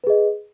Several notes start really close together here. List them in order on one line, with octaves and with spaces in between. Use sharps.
B4 G#4 D#5